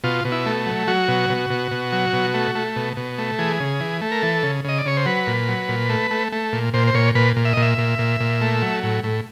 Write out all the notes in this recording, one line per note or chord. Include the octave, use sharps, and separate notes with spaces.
B2 F4
B2
E4
A3
F#3
F#3 F#4
B2
B2
B2
B2
F#3
B2
A3
A3
B2
B2
A3
E3 G#4
C#3
E3
A3
A#4
E3 A4
C#3
C#3 D#5
D5
C#3 C#5
C5
F#3 B4
A#2
F#3
A#2
A3
A3
A3
A#2
A#2 C5
C5
A#2 C#5
A#2 B4
A#2
E5
D#5
A#2
E5
A#2
A#2
A#2
A3
F#3
A2
A2